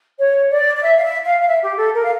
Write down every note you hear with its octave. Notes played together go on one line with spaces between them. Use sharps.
C#5
D5
D5
E5
F5
E5
F5
F5
E5
G4
A4
A#4
F5